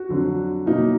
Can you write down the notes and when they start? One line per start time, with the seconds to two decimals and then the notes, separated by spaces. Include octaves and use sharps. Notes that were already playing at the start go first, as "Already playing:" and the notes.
Already playing: F#4
0.09 F2 D3 F#3
0.66 B2 F#3 A#3 D#4